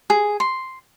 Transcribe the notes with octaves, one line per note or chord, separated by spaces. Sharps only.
G#4
C6